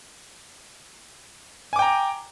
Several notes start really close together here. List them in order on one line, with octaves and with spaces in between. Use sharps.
G#5 D6 G5 A#5